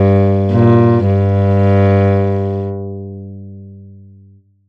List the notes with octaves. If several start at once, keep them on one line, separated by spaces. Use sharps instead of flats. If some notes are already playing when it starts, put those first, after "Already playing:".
Already playing: G2
A#2
G2